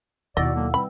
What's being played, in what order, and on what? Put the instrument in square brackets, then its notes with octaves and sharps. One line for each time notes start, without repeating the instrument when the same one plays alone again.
[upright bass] D#2 B2 [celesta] E4 F#5 E6 [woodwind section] F#4 D5 [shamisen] D#5
[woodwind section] D3 F#3 A#3
[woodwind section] E3 G3 C4 [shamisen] B5